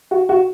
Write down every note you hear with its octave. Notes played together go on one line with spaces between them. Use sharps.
F#4
F#4